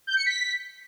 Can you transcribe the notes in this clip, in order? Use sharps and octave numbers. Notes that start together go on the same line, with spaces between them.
G6
C#7
B6